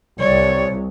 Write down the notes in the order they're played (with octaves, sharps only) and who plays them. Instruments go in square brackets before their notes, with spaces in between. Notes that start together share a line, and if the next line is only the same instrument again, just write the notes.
[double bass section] C2 [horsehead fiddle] C#5 [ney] D5